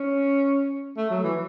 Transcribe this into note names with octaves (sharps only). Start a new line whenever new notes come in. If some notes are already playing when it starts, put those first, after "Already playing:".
Already playing: C#4
A3
F#3
E3